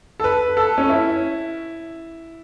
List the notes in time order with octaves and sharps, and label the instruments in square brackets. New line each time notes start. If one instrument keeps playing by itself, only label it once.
[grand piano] A4
B4
A4
C#4
E4